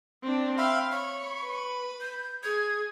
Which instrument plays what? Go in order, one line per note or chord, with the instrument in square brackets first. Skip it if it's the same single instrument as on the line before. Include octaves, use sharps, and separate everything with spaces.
[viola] C4 D4
[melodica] E5 B5 C6 [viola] F5 [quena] G5
[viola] C#5 [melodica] B5 [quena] C#6
[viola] B4
[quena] G6
[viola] G#4 [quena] G#6